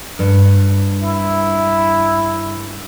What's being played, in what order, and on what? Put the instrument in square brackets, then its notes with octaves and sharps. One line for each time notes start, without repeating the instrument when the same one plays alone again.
[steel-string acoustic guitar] G2
[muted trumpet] E4